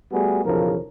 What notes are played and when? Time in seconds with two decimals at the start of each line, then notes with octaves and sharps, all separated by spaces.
0.12 G3 A3 B3 F#4 G#4
0.45 B1 E2 C#3 F3 A#4